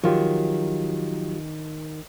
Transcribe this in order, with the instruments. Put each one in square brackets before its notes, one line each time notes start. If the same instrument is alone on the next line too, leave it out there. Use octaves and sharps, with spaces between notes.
[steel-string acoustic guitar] D#3 [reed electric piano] F3 F4 G4 [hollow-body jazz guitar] F#3